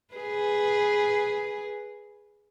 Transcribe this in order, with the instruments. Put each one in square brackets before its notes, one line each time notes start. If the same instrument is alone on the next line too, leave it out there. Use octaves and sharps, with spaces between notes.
[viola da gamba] G#4 B4